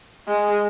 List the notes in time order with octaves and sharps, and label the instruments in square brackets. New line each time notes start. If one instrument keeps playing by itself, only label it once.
[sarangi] G#3